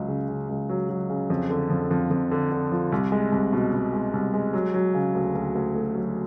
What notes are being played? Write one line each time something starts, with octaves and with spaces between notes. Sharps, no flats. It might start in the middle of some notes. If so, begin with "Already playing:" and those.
Already playing: C#2 F#3
C#3
C#3
C#2
F#3
F#3
C#3
F2
D3
F2
F2
F2
D3
D3
F3
C2
G#3
C2
B2
B2
G#3
C2
G#3
F#3
F#3
C#3
D2
D2
D2
A3
F#3